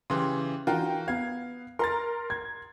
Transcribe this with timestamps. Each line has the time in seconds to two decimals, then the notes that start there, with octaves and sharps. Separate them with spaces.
0.10 C#3 E3 G4 C6
0.67 E3 D4 F4 F#4 A#4 G5
1.08 B3 F5 G#6
1.79 A#4 A#5 C6 A6
2.30 G#6